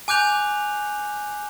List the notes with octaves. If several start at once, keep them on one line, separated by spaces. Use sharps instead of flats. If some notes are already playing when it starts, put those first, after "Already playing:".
G#5 D6 F#6 G6 F7